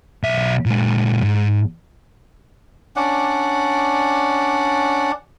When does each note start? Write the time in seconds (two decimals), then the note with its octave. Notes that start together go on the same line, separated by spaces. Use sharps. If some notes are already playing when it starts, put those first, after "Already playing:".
0.23 B1 E5
0.66 A#2 G#3
1.23 G#2
2.96 C#4 D4 D5 F#5